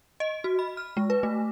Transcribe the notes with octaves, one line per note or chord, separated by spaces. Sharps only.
D#5
F#4
B5
F6
G#3
B4
A3